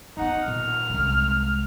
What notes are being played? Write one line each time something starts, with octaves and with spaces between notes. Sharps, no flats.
E3 B3 D#4 F#5
A#2 F6
C2 G#3